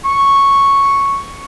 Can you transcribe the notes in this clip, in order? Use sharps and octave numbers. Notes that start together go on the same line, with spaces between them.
C#6